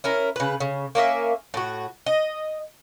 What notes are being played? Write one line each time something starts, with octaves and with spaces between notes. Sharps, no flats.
C#4 E4 A#4
C#3 B4
C#3
A#3 C#4 D4 E5
A2 F#4
D#5